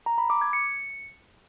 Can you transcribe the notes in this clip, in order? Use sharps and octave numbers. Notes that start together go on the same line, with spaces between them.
A#5
B5
D6
G#6
C#7